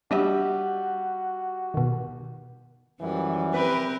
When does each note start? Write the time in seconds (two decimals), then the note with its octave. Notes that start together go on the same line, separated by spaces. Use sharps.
0.11 G3 D4 F#4 D#5 E5
1.74 B2 D#3
3.01 F#2 E3 F3 G3
3.54 C4 G4 A#4 B4